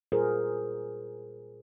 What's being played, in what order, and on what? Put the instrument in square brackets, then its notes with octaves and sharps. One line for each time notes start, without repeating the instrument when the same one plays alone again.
[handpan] A#2 G3 F4 G#4 A#4 C5